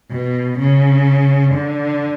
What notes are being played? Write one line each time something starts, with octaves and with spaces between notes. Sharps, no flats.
B2
C#3
D3